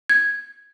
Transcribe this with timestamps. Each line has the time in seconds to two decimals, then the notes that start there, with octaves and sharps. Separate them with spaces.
0.09 G#6